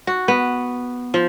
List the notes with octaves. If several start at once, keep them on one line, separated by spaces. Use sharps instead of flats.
F#4
B3
F3